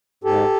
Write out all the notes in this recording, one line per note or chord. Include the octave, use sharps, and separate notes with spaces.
G#2 G4 A4